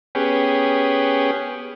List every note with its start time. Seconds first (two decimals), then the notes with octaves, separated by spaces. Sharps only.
0.15 B3 C#4 G4 G#4